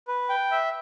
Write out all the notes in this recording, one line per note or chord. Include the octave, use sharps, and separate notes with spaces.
B4
G5
E5